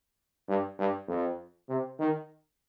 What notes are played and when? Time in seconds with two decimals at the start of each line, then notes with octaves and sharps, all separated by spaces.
0.48 G2
0.79 G2
1.08 F2
1.69 C3
1.99 D#3